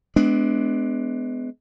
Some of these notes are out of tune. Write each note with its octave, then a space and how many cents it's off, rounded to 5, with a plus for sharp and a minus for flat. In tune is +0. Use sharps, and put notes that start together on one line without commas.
G#3 +35 B3 +35 D4 +0